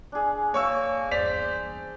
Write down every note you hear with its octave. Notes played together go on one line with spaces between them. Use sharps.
D4 G#4
A#3 C#5 C#6 E6
G1 E2 C5 D5 B6 F7